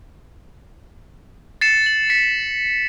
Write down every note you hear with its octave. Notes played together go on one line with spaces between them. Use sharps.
A6 C7 C#7 E7
F#7
B6 C#7